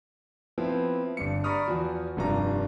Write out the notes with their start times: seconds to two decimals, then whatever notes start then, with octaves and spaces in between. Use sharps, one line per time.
0.58 F3 B3 C4 E4
1.17 G1 G2 C#7
1.44 D5 A#5 B5 C#6 D#6 F6
1.67 E2 F3 F#4
2.17 F1 G2 F3 A#5